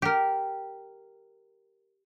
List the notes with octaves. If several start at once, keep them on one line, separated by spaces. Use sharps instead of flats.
G4 A#4